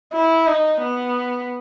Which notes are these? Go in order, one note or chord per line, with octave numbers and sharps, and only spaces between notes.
E4
D#4
B3